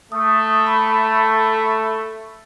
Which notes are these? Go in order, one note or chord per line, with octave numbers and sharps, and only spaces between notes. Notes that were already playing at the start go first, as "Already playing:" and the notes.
A3 D#6
B5